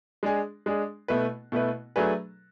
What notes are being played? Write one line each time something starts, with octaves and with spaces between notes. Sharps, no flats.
G#3 D4 G#4
G#3 D4 G#4
B2 A3 E4 B4
B2 A3 E4 B4
F#3 A3 D4 G#4 B4